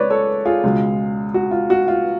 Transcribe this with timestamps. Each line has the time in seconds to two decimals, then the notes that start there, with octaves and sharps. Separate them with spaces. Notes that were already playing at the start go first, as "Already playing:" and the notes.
Already playing: C#3 G#3 B4 C#5 D5
0.10 A4 C#5
0.45 F4 G#4
0.63 C#2 B2 G#3
1.34 F#4
1.51 F4
1.70 F#4
1.88 F4